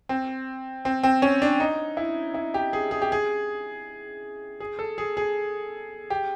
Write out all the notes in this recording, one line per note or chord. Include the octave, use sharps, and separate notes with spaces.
C4
C4
C4
C#4
D4
D#4
E4
E4
G4
G#4
G#4
G4
G#4
G#4
A4
G#4
G#4
G4